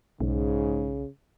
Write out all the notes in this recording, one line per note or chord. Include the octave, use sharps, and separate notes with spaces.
B1 G#2 C#3